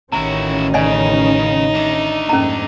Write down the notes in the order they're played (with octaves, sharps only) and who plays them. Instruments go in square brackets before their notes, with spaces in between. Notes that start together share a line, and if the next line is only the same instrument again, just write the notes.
[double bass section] A1 D#3 C#4 [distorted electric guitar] E4 F#4 [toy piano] A#5
[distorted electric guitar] C#3 [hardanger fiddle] D#4 [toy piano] D5 D#5 G#5
[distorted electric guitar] D4 E5
[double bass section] F2 G#2 A#3 [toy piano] C#4 A#5